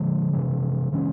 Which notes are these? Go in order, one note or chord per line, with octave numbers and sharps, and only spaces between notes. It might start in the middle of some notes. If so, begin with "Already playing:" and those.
Already playing: D3 F3 G#3
C3 E3 G#3
C#3 E3 G#3 C#4